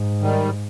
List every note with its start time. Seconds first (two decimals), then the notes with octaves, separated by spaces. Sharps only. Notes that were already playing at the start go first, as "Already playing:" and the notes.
Already playing: G#2
0.21 D#3 G3